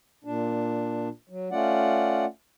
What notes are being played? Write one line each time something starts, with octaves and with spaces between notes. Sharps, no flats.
A#2 D4
F#3
A3 C#4 F4 D5 F#5